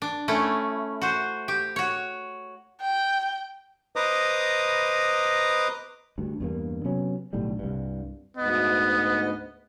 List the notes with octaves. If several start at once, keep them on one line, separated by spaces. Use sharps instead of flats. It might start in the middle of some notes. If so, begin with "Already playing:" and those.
D4
A3 C#4 E4
F#4 C5
G4
F#4 C#5
G5
B4 C5 D#5 A#5 D6 D#6
D2 G2
E2 G2 A#3
C3 F#3 B3 C#4
B1 A2 D3 G3
C2 G2
D2 G#2 B3 D#5